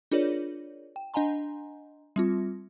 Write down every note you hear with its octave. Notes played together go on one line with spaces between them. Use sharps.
D4 F4 G#4 A#4 C#5 D5
G5
D4 D#5 F#5 G#5 A#5 C6
G3 C4 F4